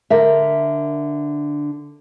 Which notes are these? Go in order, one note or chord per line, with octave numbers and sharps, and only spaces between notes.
D3 A#4 E5